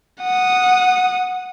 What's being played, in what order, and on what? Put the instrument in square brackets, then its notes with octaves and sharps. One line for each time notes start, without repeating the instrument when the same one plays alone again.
[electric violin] F#5 D#6